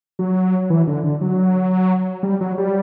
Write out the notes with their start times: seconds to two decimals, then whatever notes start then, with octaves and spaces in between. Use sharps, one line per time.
0.19 F#3
0.70 E3
0.87 D3
1.04 D3
1.21 F#3
2.23 G3
2.41 F#3
2.58 G3